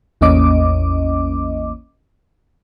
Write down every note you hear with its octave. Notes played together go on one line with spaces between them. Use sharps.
A1 E2 A#3 C#4 D#5 D6